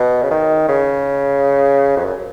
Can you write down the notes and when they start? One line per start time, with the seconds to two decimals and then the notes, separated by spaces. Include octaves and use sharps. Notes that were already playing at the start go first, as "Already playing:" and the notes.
Already playing: B2
0.23 C#3
0.31 D#3
0.69 C#3
1.97 F2
2.05 F#2